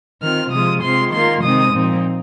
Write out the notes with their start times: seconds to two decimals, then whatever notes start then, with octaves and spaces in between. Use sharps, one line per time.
0.22 D#3 C4 F4 F6
0.52 C3 F3 G#3 F4 D#6
0.82 C3 G#3 C4 F4 C6
1.12 D#3 A#3 F4 C6
1.43 C3 D#3 G#3 C4 D#4 D#6
1.73 A#2 F3 C4 D#4